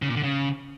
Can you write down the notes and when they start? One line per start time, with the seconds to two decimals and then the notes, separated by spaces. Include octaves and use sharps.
0.02 C#3
0.09 A#2
0.16 D3
0.23 C#3